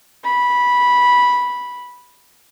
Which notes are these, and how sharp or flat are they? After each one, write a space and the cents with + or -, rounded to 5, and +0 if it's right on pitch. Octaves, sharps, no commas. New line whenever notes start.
B5 -10